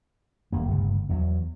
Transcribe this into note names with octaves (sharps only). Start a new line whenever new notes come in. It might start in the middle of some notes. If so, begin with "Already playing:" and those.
D#1 A#3
G1 C#2
E2 F#3